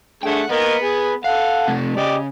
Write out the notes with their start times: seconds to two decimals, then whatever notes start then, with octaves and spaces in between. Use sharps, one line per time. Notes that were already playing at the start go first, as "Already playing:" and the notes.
0.23 D3 A3 G#4 F#5 G5
0.50 A#3 B3 A#4 D#5
0.83 G#4
1.24 A4 F5 F#5
1.68 C3 A3
1.97 C#3 G4 D5 D#5